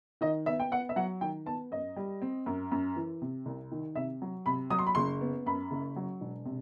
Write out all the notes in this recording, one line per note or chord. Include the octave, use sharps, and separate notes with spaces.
D#3 D#5
B3 E5
G5
B3 F#5
E5
F#3 F#5
D#3 G5
B3 A5
F#2 D#5
G3
C4
F#2
F#2
E3
C3
C2
D#3
C3 E5
F#3
C3 B5
F#3 D#6
C6
B5
F#1 C6
B3
F#2 B5
F#1
F#3
E1
C3